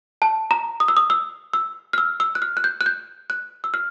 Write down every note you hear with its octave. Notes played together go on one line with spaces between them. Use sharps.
A5
A#5
D#6
E6
D#6
E6
E6
F6
E6
E6
F#6
F6
F#6
G6
F#6
G6
F#6
E6
F6